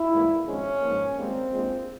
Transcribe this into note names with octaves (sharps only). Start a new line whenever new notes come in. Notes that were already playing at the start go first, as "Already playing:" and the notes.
Already playing: E4
G#2 E3 G3 A#3
G#1 G#2 F3 G#3 C#4
G#2 F3 A#3
G#1 G#2 G3 A#3 C4
A#1 A#2 F3 G#3